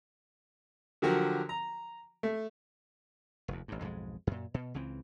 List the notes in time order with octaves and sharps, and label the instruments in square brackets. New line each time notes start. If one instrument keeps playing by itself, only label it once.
[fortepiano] D3 F3 F#3 F#4 G4 A#4
A#5
A3
[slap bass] F1 D#2
A1 G2
B1 F2 G#2 G#3
F#2 A#2
B2
C#2 C#3 E3 C4